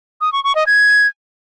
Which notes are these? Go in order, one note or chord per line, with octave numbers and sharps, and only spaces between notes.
D#6
C#6
C#6
D#5
G#6